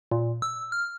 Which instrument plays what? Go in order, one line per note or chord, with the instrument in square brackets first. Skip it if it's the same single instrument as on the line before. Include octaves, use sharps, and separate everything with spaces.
[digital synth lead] A#2
E6
F6